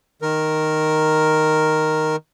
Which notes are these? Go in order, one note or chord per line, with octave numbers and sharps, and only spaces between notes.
D#3 A#4